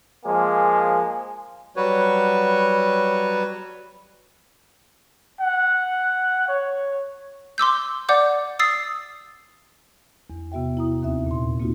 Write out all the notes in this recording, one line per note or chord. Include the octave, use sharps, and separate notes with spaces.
F3 G#3 A#3 G#5
F#3 G3 F#4 B4 C#5
F#5
C#5
C6 D6 E6 G6
D5 F#5 D6 G6
D#6 E6 A6 C7
E2
C3 B3 F#4 E5 G5
E4 A#5 D#6
D#2 C4 E5
A#2 C6
A#3 C4 D#4 F4 F#4